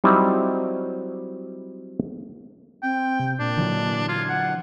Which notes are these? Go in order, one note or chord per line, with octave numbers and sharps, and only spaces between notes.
F#3 G3 C4 D#4 E4
C4 G5
C3
A#2 D4
D3 E3 F#3
F4 G#6
F#5